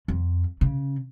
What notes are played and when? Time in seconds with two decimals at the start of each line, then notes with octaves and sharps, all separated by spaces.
0.08 F2
0.61 C#3